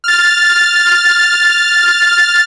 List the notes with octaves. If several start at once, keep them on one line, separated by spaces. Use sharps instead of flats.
F6 A6